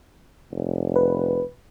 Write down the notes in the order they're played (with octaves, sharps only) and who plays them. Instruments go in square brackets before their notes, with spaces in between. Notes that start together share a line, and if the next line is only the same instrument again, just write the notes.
[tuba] F1
[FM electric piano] B4